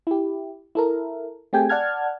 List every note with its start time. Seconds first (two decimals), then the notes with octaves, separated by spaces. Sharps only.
0.07 E4 G4
0.75 E4 A4 A#4
1.53 A3 C4 G4 G#4 G5 G#5
1.69 D5 F#5 A5 F6 G#6